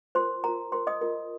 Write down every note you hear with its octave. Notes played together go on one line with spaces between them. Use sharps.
F4 A#4 C5 C6
F4 A#4 A#5
F4 A#4 C5 C6
D#5 D#6
F4 A#4